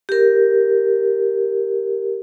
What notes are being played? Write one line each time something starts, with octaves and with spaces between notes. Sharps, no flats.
G4 A#4